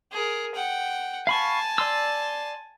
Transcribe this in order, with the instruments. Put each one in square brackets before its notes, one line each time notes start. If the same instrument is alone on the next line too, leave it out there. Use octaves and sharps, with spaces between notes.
[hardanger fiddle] G#4 A#4
F#5 G5
[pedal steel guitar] F5 B5 C#6 [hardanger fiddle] G#5 A5
[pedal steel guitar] D5 C6 E6